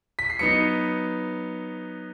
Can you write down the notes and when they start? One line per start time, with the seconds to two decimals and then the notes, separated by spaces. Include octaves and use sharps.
0.19 B6
0.30 C7
0.39 F#3 B3 D#4 C#7